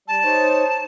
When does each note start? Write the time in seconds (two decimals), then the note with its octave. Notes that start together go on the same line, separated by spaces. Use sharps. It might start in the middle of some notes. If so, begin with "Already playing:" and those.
0.08 G3 A5
0.24 D#4 C5 C#5